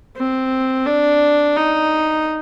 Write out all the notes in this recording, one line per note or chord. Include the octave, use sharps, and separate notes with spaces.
C4
D4
D#4